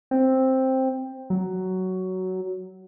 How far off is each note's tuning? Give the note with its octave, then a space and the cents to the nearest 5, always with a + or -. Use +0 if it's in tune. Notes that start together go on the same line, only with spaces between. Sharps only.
C4 +5
F#3 +10